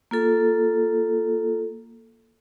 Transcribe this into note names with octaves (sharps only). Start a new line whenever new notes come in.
A#3 F4 A4